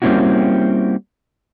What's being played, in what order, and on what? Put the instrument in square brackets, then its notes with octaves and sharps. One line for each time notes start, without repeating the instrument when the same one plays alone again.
[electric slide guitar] G3 A#3 C4 C#4 E4 F#4